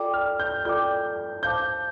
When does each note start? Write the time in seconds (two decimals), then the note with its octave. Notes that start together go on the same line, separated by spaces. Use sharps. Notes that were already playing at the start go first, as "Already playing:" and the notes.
Already playing: F4 A4 D5 G5 D6
0.14 F6
0.40 G6
0.65 F4 A4 D5 G5 D6 G6
1.43 C5 F5 A5 D6 G6